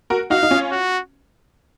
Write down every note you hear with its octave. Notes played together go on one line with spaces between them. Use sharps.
F#4 A#4
D#4 F#4 F5
D#4
C#4 F4
F#4